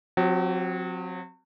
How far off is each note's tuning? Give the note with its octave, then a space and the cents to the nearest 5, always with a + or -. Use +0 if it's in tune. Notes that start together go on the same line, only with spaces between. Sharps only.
F#3 -35 C4 +0 F#4 +40